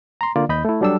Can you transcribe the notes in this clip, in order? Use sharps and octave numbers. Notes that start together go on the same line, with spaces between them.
A#5 C6
D3 A#3 F4 D5
D#2 D#5 B5 G6
A3 E4
F#3 G3 D4 A4 E6